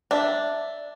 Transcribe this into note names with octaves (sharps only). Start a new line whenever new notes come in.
D4 E5